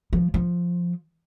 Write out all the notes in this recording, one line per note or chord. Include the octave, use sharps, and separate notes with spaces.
F3
F3